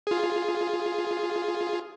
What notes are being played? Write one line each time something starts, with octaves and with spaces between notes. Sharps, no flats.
F4 G#4